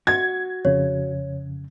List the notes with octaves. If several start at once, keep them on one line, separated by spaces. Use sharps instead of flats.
F#4 G#6
F2 C#3 C#5